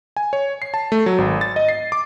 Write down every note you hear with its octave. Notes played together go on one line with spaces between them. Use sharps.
G#5
C#5
C7
A5
A3
F#3
G#1
A6
D#5
C7
D6